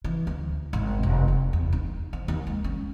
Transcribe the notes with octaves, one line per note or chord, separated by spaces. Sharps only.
E3
D2
G#1
F1
F1
E2
D#4
F3
D#2
G#3
C#4